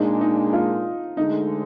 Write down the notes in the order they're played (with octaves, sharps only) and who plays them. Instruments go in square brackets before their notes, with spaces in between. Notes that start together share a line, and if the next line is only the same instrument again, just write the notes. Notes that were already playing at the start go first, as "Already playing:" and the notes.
Already playing: [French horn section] A#2 G#3 D4 [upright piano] D#4
[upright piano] D#4
F4
[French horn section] D2 D3 G#3 [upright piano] D#4